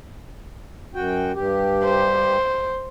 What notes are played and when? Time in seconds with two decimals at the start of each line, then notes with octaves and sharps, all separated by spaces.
0.95 F#2 F#4 G5
1.35 G2 G4
1.84 C5